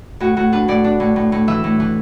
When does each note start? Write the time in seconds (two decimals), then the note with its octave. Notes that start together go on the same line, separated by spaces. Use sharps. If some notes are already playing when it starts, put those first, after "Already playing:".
0.20 A2 F#4
0.37 A2 F#4
0.52 D4 B4
0.68 A2 D5
0.84 D4
1.00 A2
1.16 A2
1.32 A2
1.48 E3 E5
1.64 A2
1.80 E3